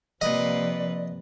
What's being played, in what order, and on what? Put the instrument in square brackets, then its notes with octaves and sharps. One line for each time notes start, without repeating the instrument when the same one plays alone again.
[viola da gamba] C3 A#3 B4 [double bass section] F3 [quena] D5 [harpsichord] D#5